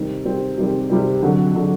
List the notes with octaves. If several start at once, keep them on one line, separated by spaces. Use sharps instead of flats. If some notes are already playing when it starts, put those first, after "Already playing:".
Already playing: C3 D#3 G3 C4
C3 D#3 G3 C4
C3 D#3 G3 C4
C3 D#3 G3 C4
F2 D3 F#3
D3 F#3